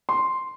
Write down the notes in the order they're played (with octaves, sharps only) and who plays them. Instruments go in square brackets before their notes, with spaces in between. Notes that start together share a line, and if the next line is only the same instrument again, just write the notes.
[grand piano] C6